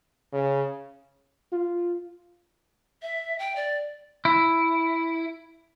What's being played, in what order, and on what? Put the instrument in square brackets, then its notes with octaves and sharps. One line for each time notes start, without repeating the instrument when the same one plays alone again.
[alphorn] C#3
[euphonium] F4
[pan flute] E5
G5
D5
[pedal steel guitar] E4